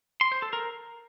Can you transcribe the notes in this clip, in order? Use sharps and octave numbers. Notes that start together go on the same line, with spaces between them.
C6
C5
A4
A#4